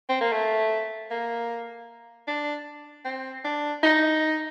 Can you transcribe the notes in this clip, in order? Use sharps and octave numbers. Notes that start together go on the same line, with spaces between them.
C4
A#3
A3
A#3
D4
C4
D4
D#4